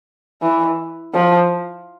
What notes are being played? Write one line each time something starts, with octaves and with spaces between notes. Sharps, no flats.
E3
F3